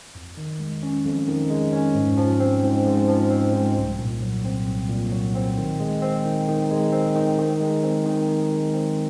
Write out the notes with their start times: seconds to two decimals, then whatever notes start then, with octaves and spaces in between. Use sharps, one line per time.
0.15 F2
0.37 D#3
0.59 G#3
0.83 C#4
1.05 F2
1.28 D#3
1.50 G#3
1.73 C#4
1.95 G#2
2.17 F3
2.40 C4
2.63 G#2
2.86 G#2
3.08 F3
3.30 C4
3.53 G#2
3.77 C2
3.99 A#2
4.22 F#3
4.45 C4
4.66 C2
4.89 A#2
5.12 F#3
5.35 C4
5.58 D#3
5.80 G#3
6.02 C4
6.25 D#3
6.48 D#3
6.71 G#3
6.93 C4
7.15 D#3
7.39 D#3
7.61 G#3
7.83 C4
8.06 D#3
8.28 D#3
8.51 G#3
8.74 C4